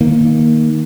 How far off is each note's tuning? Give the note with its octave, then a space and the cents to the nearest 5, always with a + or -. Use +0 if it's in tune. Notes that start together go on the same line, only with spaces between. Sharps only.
D#3 +5 A#3 +0